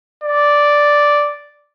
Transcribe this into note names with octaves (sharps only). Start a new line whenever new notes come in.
D5